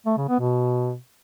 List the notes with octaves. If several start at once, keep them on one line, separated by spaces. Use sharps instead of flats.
A3
C#3
B3
B2